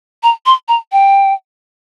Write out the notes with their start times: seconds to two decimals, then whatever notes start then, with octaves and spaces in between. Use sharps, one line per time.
0.23 A#5
0.46 C6
0.68 A#5
0.92 G5